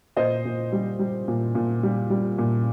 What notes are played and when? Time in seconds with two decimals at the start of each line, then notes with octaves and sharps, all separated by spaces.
0.17 A#2 C5 D#5
0.45 A#2
0.72 G3
0.99 G3
1.28 A#2
1.55 A#2
1.83 G3
2.10 G3
2.38 A#2